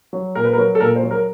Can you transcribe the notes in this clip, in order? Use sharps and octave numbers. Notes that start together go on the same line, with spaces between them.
F#3
A#2 A#4
B4
A#4
F#3
A4
A#2 A#4
C5
F#3
A#4